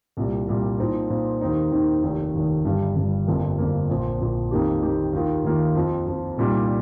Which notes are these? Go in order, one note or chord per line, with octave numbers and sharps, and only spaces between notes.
C2 A#2 G3
C2 A#2 G3
A#2 F3 C4 D#4
A#2 F3 C4 D#4
D#2 D#3 C4 D#4
D#2 D#3 C4 D#4
F1 D#2 D#3
F1 D#2 D#3
G1 G2 G3
G1 G2 G3
G1 F2 F3 A#3
G1 F2 F3 A#3
A#1 A#2 F3 C4
A#1 A#2 F3 C4
F2 D#3 A#3 D#4 G4
F2 D#3 A#3 D#4 G4
D#2 D#3 A#3 F4
D#2 D#3 A#3 F4
F2 F3 C4
F2 F3 C4
C2 A#2 G3 D#4